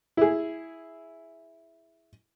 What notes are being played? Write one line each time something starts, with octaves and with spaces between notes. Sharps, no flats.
E4 G#4